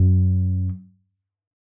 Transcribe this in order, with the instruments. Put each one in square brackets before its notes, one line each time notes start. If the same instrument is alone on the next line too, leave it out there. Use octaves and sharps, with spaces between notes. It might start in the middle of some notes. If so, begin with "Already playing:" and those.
Already playing: [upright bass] F#2